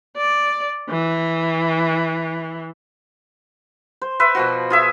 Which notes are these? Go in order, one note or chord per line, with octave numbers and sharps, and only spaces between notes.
D5
E3
C5
B4 C5 E5
B2 F3 F#4
F4 G#4 E5